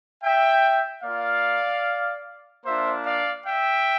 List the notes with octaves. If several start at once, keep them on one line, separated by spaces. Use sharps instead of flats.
E5 G5
A#3 F4 D5 F5
A#3 D4 F4 C5 E5
D5 F5
E5 G5